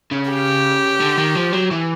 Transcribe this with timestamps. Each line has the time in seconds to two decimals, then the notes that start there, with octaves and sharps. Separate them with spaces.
0.12 C#3
0.30 G4
1.00 D3
1.18 D#3
1.35 F3
1.53 F#3
1.71 E3